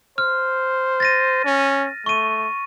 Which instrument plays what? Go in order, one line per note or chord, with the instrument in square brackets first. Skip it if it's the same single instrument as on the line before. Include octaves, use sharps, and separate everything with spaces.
[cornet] C5 [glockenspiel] F6
[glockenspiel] A6 A#6 D#7
[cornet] C#4
[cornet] A3 [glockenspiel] C#6 D#7